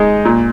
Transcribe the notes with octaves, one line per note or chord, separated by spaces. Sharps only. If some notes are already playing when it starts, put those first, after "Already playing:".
Already playing: G#3 D#4
A#2